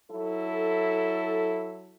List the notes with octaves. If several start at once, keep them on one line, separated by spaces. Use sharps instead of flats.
F#3 E4 A4